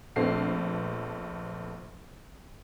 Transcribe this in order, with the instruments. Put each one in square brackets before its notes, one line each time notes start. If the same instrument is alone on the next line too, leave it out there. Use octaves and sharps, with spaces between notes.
[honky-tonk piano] A#1 F3 A3 B3 C4 C7